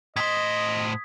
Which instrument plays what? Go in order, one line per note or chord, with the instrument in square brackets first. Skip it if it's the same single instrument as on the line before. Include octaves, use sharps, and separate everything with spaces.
[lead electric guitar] A2 C5 [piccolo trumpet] D#5 [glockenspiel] D#6 G#6 B6